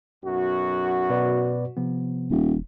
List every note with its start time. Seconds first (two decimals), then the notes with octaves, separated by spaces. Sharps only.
0.24 B1 F#2 F#4
1.10 B2 B4 D5
1.77 C3 F3 B3
2.31 D#1